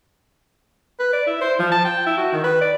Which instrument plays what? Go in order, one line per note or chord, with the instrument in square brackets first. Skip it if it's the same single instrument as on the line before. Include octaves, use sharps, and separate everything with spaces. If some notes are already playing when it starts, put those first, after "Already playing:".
[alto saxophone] B4
D5
E4
C5
F3
A5
G5
E4
F#4
D#3
B4
D5